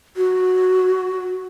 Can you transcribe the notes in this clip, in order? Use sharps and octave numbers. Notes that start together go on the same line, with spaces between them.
F#4